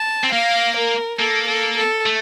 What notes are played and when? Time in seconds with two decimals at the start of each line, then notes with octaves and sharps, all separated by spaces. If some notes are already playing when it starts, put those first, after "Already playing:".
Already playing: A5
0.24 C4
0.33 A#3 F5
0.77 A#4
1.19 A#3 A4
1.48 A4
1.77 A4
2.06 A3